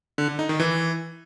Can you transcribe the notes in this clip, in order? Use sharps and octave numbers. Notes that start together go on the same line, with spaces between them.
D3
D3
D#4
D#3
E3